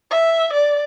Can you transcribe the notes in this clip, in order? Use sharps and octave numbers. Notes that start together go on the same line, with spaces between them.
E5
D5